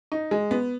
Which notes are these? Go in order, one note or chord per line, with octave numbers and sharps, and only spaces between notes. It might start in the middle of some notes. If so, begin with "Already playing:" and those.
D#4
G#3
B3